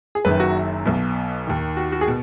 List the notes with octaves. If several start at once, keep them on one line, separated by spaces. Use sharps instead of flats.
G#4
F#1 F#2 D#3 B4
F#4
B1 B2
D#2 D#3
F#4
F#4
G#4
B2